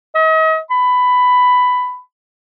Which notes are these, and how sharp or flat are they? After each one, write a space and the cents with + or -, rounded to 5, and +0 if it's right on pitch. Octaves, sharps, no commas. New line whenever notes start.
D#5 +40
B5 +10